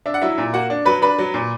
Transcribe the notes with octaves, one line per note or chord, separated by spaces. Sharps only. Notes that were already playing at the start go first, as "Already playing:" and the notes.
D4 E5
F#5
F#3 E4 E5
A#2
A#3 F#4 F#5
D4
F#3 B4 B5
D4 B4 B5
F#3
A#2